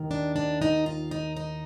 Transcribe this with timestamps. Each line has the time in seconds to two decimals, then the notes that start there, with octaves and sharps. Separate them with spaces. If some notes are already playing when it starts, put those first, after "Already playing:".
Already playing: D#2 D#3
0.11 D4
0.36 D4
0.62 D#4
0.86 F4
1.11 D#4
1.37 D#4